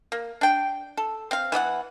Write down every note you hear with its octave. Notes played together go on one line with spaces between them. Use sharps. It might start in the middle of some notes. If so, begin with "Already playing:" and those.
A#3
D4 G5
A4
C4 F5
E3 B3 D#5 F#5